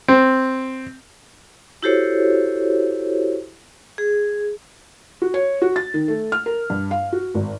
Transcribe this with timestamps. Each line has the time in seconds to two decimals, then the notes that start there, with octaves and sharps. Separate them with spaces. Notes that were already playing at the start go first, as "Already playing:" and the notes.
0.08 C4
1.83 E4 F#4 G4 A4 C5 C#5
3.98 G#4
5.22 F#4
5.34 C#5
5.62 F#4
5.76 A6
5.94 D#3
6.08 A3
6.32 F6
6.46 A#4
6.70 G2
6.91 F5
7.13 F#4
7.35 G#1